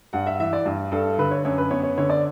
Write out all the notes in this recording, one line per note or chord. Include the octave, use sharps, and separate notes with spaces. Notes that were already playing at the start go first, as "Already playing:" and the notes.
G2 F#5
E5
E3 E5
D5
G2
G2 A4
D3 B4
C#5
F#2 C#5
B4
B3 C#5
C#5
D3 C#5
D5